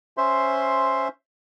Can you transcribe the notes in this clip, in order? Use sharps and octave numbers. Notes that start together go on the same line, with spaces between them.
C#4 C5 E5 C6